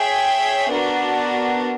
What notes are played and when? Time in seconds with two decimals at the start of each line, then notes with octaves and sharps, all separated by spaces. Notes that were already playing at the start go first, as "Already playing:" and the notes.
Already playing: G#4 C#5 E5 G5
0.71 B3 D4 F#4 A#4